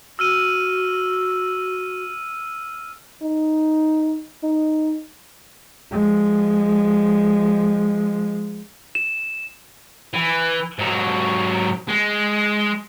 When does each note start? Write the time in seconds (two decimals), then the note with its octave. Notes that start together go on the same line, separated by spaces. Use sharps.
0.19 F#4 E6 F6 D#7
3.22 D#4
4.44 D#4
5.91 F3 G#3
8.95 E7
10.14 E3
10.79 G#2 F#3
11.88 G#3